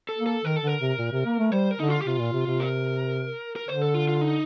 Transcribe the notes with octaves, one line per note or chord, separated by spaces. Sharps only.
A4
A#3
A4
D#3 A#4
A4
D3 A#4
C3
A#2
C3
A#3
A3
G3 C5
A#4
D3 D#4
F4
G4
C3 F4
A#2
C3
C3
A#4
A#4
D3 C5
A4
F4
F4
D#4